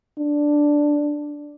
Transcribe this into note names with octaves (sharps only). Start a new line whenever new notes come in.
D4